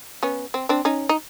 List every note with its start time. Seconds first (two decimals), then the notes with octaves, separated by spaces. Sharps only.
0.23 B3 C#4
0.54 C4
0.69 C4 D4
0.85 C#4 D#4
1.09 D#4